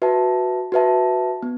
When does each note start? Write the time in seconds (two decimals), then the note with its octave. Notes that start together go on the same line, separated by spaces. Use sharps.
0.02 F#4 B4 E5 A5
0.72 F#4 B4 E5 A5
1.43 B3